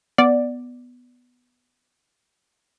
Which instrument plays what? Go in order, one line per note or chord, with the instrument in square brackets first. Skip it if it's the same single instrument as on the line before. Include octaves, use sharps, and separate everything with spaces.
[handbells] B3 [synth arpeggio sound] D5